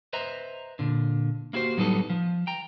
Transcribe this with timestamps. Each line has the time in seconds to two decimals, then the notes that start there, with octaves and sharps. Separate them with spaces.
0.13 B4 C5 D#5 E5 A#5
0.79 A#2 D3
1.53 A#3 E4 F#4 G4 C5
1.77 A2 F#3 G3 B3 D#4 A4
2.10 F3
2.47 G5 A#5